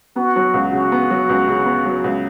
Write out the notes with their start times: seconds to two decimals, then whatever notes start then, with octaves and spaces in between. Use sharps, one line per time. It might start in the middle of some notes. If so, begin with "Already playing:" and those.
0.16 B3 F#4
0.36 F#3
0.54 C#2
0.73 C#3 F#4
0.92 B3
1.10 F#3
1.29 C#2
1.48 C#3
1.66 B3
1.85 F#3
2.04 C#2